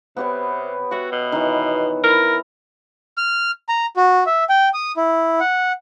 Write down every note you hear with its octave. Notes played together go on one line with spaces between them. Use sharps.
C3 B3 G4 C#5
F#4 C#5 E5 F#5
B2
D#3 E3
E4 A#4
F6
A#5
F#4
E5
G5
D#6
E4
F#5